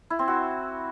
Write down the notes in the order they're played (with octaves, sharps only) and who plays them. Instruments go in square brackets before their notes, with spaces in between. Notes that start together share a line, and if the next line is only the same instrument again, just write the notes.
[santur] E4
C4
F#4